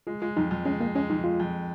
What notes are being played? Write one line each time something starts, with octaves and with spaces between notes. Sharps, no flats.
G#3 F4
G#3 F4
F2 D#4
F2
G#3 C#4
G#3 A#3
G#3 C#4
F2 D#4
G#3 F4
F2